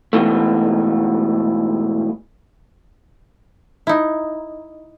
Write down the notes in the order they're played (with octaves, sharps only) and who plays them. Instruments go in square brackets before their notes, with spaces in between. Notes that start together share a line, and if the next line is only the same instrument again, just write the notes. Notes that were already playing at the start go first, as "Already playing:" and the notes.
[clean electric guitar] G#2 B2 E3 A3
[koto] D#4 E4